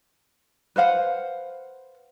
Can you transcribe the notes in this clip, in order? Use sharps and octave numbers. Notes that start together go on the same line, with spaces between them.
B4 C5 F5 F#5